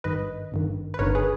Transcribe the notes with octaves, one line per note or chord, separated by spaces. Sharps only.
G#1 G2 D#3 B4 D#5
G#1 G2 D#3
B4
G1 G2 D#3 A#4 C#5
G#4 B4